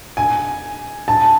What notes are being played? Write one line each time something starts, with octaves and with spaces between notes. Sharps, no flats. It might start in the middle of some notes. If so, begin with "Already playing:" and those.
G#5
A5